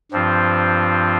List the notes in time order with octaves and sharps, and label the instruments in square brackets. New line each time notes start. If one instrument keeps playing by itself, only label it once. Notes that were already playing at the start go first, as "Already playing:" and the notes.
[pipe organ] G2 F3 C4 F4